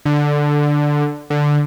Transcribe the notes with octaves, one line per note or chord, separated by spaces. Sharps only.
D3
D3